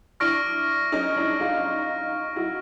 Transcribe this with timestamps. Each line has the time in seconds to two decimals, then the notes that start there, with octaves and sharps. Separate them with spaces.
0.20 D4 E4 C#6 F6 A#6 D7
0.92 C#4 D#4
1.17 D4 E4
1.40 D#4 F4
2.36 E4 F#4